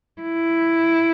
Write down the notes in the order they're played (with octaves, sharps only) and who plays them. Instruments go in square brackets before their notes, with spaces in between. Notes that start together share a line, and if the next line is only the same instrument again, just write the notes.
[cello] E4